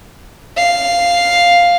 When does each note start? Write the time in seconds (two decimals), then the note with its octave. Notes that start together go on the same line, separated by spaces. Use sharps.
0.57 F5